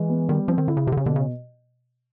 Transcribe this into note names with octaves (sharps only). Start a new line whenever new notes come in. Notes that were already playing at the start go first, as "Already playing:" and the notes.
Already playing: E3 G#3
B3
D#3 G3
F3 C4
D#3
D3 E4
C#3
C3 G4
D3
C#3
B2 D3
C#3